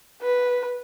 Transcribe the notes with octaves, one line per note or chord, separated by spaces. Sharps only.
B4